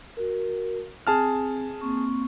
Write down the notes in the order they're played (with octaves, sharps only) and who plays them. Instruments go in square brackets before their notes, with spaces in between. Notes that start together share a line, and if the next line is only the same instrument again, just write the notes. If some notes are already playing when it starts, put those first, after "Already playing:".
[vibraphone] F#4 A#4
[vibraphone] C4 [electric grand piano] G#4 A5 F6
[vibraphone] A#3 C4 C#6